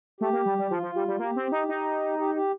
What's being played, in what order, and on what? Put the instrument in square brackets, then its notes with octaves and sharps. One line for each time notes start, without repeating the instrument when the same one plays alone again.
[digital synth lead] A3 [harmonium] G4
[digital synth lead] A#3
G3
G3
[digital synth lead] F3 [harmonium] F4
[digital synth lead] F3
G3
G3
[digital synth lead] A#3 [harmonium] G4
[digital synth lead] C4
D#4
D#4
[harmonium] G4
G4